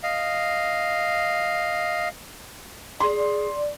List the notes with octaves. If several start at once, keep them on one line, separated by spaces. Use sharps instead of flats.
D#5 F5
G#4 D5 C6